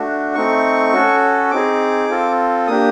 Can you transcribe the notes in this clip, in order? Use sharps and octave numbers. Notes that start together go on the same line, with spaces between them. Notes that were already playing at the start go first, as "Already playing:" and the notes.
Already playing: A3 D4 F#4
A3 C4 D#4 C#6
C#4 F#4 A4
C4 D#4 G#4 D6
C4 F4 A4
A#3 D4 G4 D#6